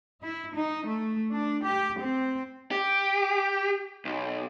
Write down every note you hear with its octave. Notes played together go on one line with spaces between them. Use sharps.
E4
D#4
A3
D4
G4
C4
G4
B1